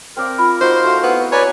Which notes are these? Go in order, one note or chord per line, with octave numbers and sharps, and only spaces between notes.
C4 A#4 D5 F5
F4 B5
D#4 F#4 C5 F5
A3 F#4 F5
B3 E4
B4 C#5 D5 G#5 A#5